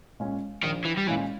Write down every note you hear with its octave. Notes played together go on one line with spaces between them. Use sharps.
A#2 G#3 C#4
A#1 D#3
E3
G3
A#2 E3 G#3 C#4